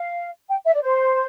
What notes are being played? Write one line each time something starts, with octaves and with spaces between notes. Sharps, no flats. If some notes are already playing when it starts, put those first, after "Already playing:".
Already playing: F5
G5
E5
D5
C5